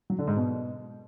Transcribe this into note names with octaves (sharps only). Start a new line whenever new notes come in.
F#3
D3
G#2
B2